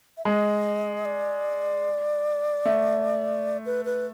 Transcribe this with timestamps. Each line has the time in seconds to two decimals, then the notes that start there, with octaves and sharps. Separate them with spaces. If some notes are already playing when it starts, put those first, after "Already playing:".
0.17 E5
0.25 G#3 D#5
1.05 D5
2.65 A3
3.66 B4
3.85 B4